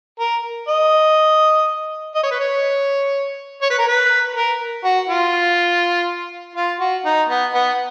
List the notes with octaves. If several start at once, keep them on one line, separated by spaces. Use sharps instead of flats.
A#4
D#5
D#5
C#5
B4
C#5
C#5
B4
A#4
B4
A#4
F#4
F4
F4
F#4
D#4
B3
B3